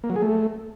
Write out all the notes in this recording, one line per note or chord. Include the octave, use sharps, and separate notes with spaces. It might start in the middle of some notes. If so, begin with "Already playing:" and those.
A#3
F#3
G#4
A3